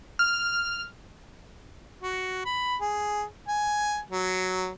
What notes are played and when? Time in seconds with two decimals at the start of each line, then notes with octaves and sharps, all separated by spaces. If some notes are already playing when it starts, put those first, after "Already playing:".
0.19 F6
2.02 F#4
2.45 B5
2.81 G#4
3.48 G#5
4.11 F#3